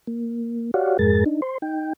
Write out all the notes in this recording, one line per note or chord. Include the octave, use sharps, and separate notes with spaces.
A#3
F#4 G4 C#5 D5 F5 F#5
F2 G#2 G#3 G#4 A#4 A6
D4 D#4
C5 C6
D#4 G5